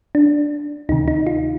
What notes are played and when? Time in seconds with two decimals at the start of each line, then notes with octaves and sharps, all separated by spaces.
0.15 D4
0.89 D2 C3 D#3 D#4
1.08 D#4
1.27 F4